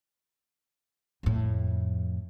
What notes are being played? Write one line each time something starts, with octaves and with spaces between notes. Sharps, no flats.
F2 A2